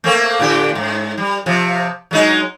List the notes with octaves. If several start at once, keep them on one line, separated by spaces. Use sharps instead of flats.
A3 A#3 C4
A2 D3 G4
G#2
G3
C3 F3
F#3 G#3 D#4